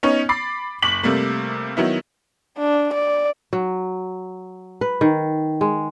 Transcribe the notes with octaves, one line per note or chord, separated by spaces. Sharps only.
B3 C#4 D#4 C#5
B5 D6 A6 C7
F#1 C#6 D6 B6 F#7
C3 G3 A3 A#3
D#3 F#3 B3 E4
D4
D5
F#3
B4
D#3
G#3